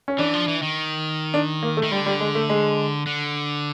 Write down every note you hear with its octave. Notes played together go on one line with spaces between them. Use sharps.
C#4
E3 D4
F3
E3
D#3
D4
A#3
A3
D#3
D3 G3
G3
G#3
A3
G#3
D3